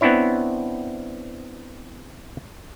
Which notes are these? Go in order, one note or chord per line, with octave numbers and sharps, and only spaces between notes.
B3 C4 D4 E4 C#5